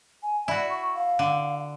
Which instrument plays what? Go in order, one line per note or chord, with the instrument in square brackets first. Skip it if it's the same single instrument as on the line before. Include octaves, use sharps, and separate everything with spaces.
[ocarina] G#5
[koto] E4 F#4 [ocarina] D5
[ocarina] C#6
F5
[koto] D3